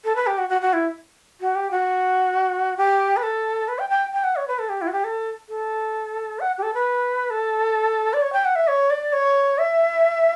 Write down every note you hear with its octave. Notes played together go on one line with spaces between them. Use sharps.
A4
B4
G4
F#4
F#4
F#4
E4
F#4
G4
F#4
G4
B4
A4
B4
G5
G5
G5
F#5
C#5
B4
A4
G4
E4
F#4
G4
A4
A4
F#5
G4
A4
B4
A4
D5
C#5
G5
F#5
E5
C#5
D5
C#5
E5